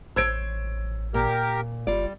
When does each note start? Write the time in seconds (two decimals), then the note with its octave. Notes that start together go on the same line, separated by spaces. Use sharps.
0.16 A1 C5 C#5 E6 G#6 D7
1.14 A#2 G4 A#4
1.87 F#1 G3 F4 D5